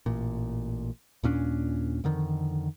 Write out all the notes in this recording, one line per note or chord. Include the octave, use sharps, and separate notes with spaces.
A1 A#2
D#2 A#2 C#4 D4
F2 D3 D#3